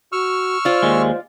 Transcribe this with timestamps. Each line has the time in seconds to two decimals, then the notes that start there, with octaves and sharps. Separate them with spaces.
0.12 F#4 C#6 E6 F6
0.65 F4 C5 D5
0.82 D#2 G#3